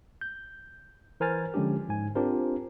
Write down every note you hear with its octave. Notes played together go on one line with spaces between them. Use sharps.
G6
E3 A#4 C5 G#5 F6 A6
D3 F3 G#3 C#4 D4 G4
G#2 G#5
C4 D4 F4 G4 A#4 C5